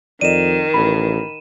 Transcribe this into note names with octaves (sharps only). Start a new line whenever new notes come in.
F2 D#3 D5 D#5 D#7 E7
A1 B5